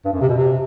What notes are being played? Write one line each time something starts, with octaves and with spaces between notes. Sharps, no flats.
G2
F#2
C3
B2
C3